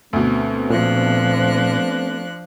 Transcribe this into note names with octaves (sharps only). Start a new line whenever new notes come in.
D2 B2 A3 B3 C4
A#2 F3 D4 F#6